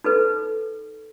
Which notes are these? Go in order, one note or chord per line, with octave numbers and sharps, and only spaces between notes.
D#4 A4 B4